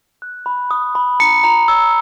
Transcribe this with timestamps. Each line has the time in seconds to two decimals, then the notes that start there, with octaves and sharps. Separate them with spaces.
0.22 F#6
0.46 B5
0.71 D#6
0.95 B5
1.20 A#5 C#7
1.44 A#5
1.68 E6